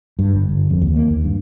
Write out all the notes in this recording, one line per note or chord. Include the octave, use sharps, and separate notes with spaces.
G2
G1
G1
F2
D#2
A#3
D#2
G2